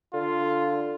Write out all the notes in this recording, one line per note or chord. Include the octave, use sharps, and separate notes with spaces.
D3 F4